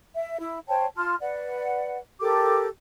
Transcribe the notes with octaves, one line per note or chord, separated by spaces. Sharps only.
E5
E4
C5 C#5 G5 A5
F4 A5 C6 F6
B4 D5 F#5
G4 A4 A#4 D6